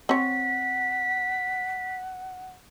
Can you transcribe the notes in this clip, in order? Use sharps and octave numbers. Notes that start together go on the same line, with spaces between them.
C4 C#5 F#5 B6